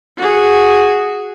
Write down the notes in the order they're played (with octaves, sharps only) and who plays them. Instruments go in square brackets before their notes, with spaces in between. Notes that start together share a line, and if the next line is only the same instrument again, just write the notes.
[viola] F#4 G#4